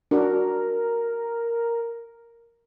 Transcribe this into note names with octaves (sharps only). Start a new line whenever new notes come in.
D4 F#4 A#4